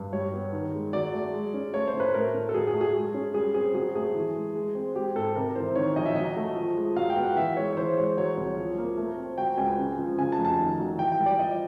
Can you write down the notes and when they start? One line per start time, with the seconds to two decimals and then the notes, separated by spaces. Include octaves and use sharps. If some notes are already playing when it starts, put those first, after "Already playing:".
Already playing: G2
0.13 G3 C#5
0.33 B3
0.53 D#3
0.73 G#3
0.93 F#3 D5
1.13 A3
1.34 G#3
1.54 C#4
1.74 A3 C#5
1.87 C5
1.94 A2
2.00 B4
2.14 A3 A#4
2.34 A2
2.49 A4
2.54 F#3 G#4
2.67 G#4
2.74 A3
2.81 G#4
2.95 G#3
3.14 C#4
3.34 G3 G#4
3.54 C4 G#4
3.74 F#3 G#4
3.95 A3 G#4
4.15 E3
4.35 G#3
4.55 G#3
4.75 C4
4.95 G#3 G4
5.15 G#2 A4
5.36 C3 A#4
5.55 E3 C5
5.76 D#3 C#5
5.96 A#1 D#5
6.06 E5
6.15 F#3 D#5
6.37 A3
6.56 F3
6.77 G#3
6.96 F#3 F5
7.10 G5
7.16 B3
7.23 F#5
7.36 E3 E5
7.57 G#3 C#5
7.73 C#5
7.77 E3 C5
7.97 G#3 C#5
8.17 F#3 C#5
8.38 C2
8.57 F3
8.78 A#3
8.97 A3
9.18 C4
9.38 F#3 G5
9.58 C#2 G#5
9.79 C#3
9.99 F3
10.18 C#3 G#5
10.32 A5
10.38 F1
10.45 A5
10.58 D#3
10.79 F#3
10.98 E3 G5
11.12 G5
11.18 G3
11.26 D5
11.39 F3 D#5